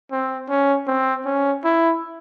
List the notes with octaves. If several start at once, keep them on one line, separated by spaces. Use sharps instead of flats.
C4
C#4
C4
C#4
E4